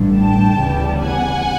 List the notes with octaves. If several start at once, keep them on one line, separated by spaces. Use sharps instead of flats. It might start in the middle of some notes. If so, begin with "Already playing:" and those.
Already playing: A1 G2 D3
G5 A5
D2 C#3 E3 G3 B3
F#5 G#5